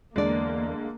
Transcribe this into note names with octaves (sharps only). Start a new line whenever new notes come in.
E2 D3 G#3 A#3 D5